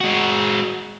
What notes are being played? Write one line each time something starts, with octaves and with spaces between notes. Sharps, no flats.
G#3 F#4